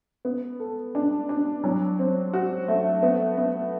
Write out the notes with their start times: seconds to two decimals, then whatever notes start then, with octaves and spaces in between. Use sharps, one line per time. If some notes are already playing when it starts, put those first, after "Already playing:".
0.25 B3
0.60 A4
0.95 D4
1.29 D4
1.64 F#3
1.99 C4
2.33 F#4
2.68 A3
3.03 B3
3.37 B3